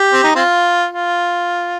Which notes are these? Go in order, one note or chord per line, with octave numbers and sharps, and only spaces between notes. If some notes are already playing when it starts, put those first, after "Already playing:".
Already playing: G4
C4
D#4
C4 F4
F4